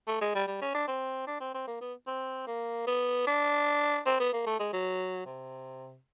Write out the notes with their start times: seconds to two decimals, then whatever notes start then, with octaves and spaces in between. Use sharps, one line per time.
0.07 A3
0.21 G#3
0.35 G3
0.47 G3
0.62 C#4
0.74 D4
0.88 C4
1.27 D4
1.40 C4
1.54 C4
1.67 A#3
1.81 B3
2.07 C4
2.47 A#3
2.87 B3
3.27 D4
4.06 C4
4.20 B3
4.33 A#3
4.46 A3
4.59 G#3
4.73 F#3
5.25 C3